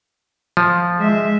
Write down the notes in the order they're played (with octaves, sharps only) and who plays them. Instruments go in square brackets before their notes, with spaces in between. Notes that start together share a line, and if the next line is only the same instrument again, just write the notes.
[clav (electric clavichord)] F3
[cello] G#3 E5